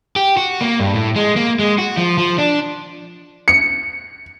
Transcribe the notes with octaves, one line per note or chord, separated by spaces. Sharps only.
G4
F#4
A#3
G2
A2
G#3
A#3
G#3
F#4
F3
F3
D4
C#7